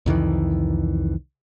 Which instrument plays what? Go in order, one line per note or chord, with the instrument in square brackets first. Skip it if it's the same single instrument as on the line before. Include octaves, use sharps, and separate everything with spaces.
[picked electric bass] C2 F2 D#3 E3